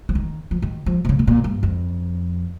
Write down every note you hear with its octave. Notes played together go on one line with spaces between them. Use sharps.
F3
D#3
F3
D#3
F3
C3
C#3
C3
A#2
G2
F2